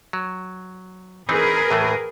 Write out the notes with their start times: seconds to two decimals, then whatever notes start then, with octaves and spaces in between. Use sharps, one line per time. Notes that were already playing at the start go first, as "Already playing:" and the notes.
0.13 F#3
1.29 E3 C4 D#4 G#4 A#4 B4
1.71 A2 E3 A3